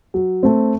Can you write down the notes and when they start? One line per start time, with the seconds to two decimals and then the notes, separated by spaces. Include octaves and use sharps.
0.14 F#3
0.43 A3 C4